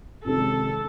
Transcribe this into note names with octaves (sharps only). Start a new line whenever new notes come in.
F2 C3 D#3 G#3 C#4 A4